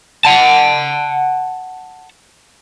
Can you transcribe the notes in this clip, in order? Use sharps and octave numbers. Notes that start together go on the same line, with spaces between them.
F#5 A5